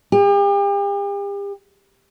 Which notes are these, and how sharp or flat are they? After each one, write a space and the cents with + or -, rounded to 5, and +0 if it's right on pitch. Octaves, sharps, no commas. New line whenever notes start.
G4 +40